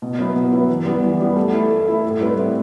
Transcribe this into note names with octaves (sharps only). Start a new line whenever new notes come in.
B2
F#3 B3 E4 B4
B2
F#3 B3 E4 B4
E3
G3 B3
E3
G3 B3
A3
E4 A4
A3
E4 A4
A2
G3 C4 E4 B4
A2